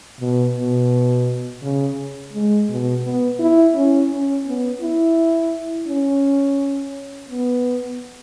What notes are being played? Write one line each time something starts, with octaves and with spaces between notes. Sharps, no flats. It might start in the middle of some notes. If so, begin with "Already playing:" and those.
B2
B2
C#3
G#3
B2
B3
E4
C#4
C#4
B3
E4
C#4
B3